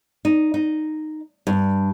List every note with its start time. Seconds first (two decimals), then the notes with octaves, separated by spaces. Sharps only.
0.25 D#4
0.54 D#4
1.47 G2